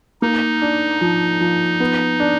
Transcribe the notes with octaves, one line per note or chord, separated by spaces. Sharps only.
A#3 D#4
D4
F3
F3
B3
D4